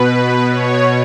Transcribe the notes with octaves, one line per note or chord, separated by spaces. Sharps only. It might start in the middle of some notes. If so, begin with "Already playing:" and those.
Already playing: B2 B4
C#5